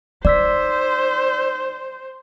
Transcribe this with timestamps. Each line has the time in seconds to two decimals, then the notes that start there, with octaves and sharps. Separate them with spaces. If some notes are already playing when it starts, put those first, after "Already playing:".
0.25 D#4 C5 D5 E6 B6